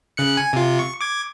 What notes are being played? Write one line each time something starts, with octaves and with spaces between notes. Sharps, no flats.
C#3 F#6 C#7
G#5
C3 F4
C#6
D6 G#6